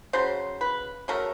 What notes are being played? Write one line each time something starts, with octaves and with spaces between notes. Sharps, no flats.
C#3 F#3 C5
B4
C#3 F#3 A3 A#4